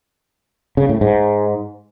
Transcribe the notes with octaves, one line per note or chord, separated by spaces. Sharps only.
C#3
A2
G#2